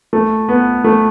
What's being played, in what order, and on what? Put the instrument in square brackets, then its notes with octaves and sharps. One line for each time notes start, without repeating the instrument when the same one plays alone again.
[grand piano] A3
B3
A3